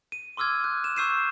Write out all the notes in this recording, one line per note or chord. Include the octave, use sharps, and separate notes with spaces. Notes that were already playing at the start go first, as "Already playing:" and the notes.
D#7
C6 D6 E6 F6 G#6
F#6
E7
C#6 E6 G6 C7 D#7 E7